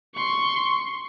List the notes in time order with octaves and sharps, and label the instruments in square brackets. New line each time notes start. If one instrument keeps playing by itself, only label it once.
[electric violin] C6 C#6